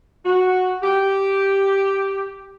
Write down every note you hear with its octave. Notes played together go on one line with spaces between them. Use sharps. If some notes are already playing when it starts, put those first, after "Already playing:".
F#4
G4